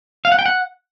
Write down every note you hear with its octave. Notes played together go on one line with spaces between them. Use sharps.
F5
F#5
G5
F#5